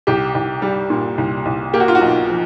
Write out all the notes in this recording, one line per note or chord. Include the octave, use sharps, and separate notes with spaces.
C2 G4
C2
G3
A#2
C2
C2
A#3 G4
F#4
F4
F#4
B1
F3